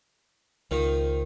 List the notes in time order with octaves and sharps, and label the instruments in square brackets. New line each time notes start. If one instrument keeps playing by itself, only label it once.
[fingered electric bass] C#2 [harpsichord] D#3 F3